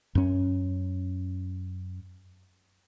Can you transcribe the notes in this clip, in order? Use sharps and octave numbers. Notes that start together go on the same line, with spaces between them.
F#2 C#4